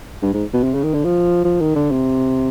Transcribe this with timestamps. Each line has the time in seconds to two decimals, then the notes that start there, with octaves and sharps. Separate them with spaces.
0.22 G2
0.34 G#2
0.53 B2
0.63 C3
0.74 C#3
0.84 D#3
0.94 D3
1.04 F3
1.45 F3
1.60 D#3
1.76 D3
1.91 C3